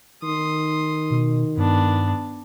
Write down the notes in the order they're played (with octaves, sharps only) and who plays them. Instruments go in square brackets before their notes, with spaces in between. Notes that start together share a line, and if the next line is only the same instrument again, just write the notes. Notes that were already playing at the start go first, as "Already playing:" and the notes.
[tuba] D#3 [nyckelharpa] C6 D#6
[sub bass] B2
[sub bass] G2 [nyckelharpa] B3 D4